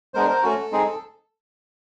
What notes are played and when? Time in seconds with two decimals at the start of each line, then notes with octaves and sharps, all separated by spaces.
0.14 G#3 B3 D4 A#4 C5
0.29 A#4 C5
0.43 A3 C#4 F#4 A4
0.72 G#3 C4 D#4 G#4